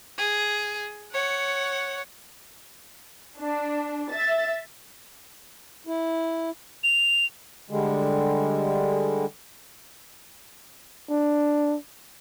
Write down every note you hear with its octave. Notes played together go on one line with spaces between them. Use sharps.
G#4
C#5 F#5
D4
E5 A6
E4
F7
D3 G3 G#3
D4